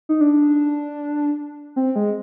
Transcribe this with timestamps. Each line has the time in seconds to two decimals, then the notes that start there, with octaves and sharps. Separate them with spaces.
0.09 D#4
0.21 D4
1.76 C4
1.96 G#3